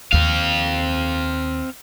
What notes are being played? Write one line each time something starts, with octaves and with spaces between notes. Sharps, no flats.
D#2 C4 F5